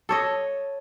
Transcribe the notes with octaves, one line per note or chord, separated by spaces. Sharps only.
A4 C#5 D#5